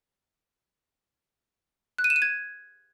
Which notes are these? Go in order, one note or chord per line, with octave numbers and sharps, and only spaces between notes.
F#6
D#7
E7
D#7
G#6